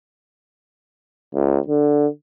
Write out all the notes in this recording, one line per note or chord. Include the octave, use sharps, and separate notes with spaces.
C#2
D3